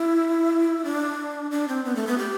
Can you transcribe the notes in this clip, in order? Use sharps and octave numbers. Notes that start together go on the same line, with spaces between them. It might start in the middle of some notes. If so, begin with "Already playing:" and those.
Already playing: E4
D4
D4
C4
B3
A3
B3
G4